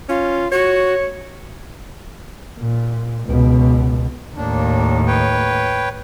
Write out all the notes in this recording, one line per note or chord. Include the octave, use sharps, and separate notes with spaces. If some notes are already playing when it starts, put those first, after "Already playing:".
C#4 F4
F#4 C#5
A#2
C#2 B2
D#2 A2 A#3 D4
B4 C#5 G5